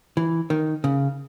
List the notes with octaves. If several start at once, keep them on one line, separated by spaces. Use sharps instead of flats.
E3
D#3
C#3